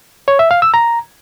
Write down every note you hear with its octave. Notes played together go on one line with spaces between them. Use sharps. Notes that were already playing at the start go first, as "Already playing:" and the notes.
C#5
E5
F5
E6
A#5